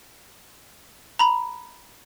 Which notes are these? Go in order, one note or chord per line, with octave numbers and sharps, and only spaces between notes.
A#5 B5